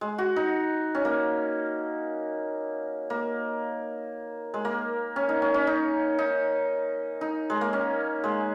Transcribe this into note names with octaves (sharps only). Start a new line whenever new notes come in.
G#3
F#4
D#4
C#4
A#3
A#3
G#3
A#3
C#4
D#4
C#4
C#4
D#4
D#4
D#4
G#3
A#3
C#4
G#3